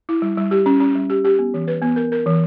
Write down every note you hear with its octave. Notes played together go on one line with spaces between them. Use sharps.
E4
G3
G3
G4
C#4
C#4
G3
G4
G4
B3
E3
B4
B3
A#4
A#4
E3